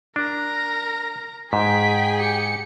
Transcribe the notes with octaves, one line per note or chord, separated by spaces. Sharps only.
D4 A#4 A#5
G#2 G#4 G5 B6
G4 C#7